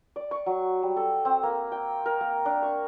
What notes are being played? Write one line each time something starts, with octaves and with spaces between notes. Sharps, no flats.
D5
C#6
F#3
G3
A4
C4
A#3
G5
A#4
A#3
D4
C#6